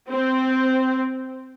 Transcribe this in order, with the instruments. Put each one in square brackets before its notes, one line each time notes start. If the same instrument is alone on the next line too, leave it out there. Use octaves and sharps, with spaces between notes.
[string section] C4